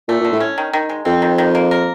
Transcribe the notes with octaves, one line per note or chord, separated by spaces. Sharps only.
A#2 A3
A#2 D3
A2
C#4
D#3
D#3
G#3
F2 C4
D#3
D#3
A#3
A#4